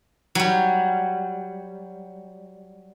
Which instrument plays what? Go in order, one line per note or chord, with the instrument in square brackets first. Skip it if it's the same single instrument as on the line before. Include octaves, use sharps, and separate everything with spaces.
[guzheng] F#3 G3